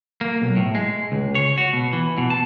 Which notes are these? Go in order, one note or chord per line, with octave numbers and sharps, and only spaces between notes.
A#3
B1
A2
G#3
C#2
C#5
F#4
B2
E3
B2
A5